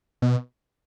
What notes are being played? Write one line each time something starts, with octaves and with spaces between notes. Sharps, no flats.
B2